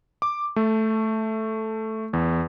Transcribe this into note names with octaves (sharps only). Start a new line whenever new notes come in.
D6
A3
E2